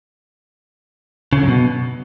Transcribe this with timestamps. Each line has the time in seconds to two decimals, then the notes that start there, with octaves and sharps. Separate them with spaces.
1.33 C#3
1.38 D3
1.43 F#2
1.48 B2